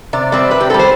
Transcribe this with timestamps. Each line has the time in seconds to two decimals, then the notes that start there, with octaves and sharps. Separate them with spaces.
0.13 C3 D5
0.32 G3 C4 D5
0.51 C3 B4
0.60 G4
0.70 G3 C4 A4
0.79 C5